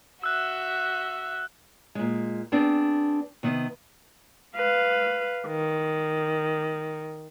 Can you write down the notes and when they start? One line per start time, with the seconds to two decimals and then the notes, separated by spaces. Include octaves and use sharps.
0.23 F#4 E5 E6 F#6
1.95 A#2 G#3
2.52 B3 C4 D4 G#4
3.43 C3 D#3 B3
4.55 B4 F5
5.47 D#3